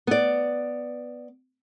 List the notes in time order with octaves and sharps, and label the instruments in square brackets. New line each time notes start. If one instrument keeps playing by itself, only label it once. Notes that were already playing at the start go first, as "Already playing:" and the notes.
[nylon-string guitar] B3 D5